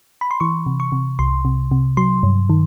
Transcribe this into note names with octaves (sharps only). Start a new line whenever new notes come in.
B5
C6
E3 C#6
C3
C#6
C3
C2 C6
C3
C3
F#3 C6
G2
D#3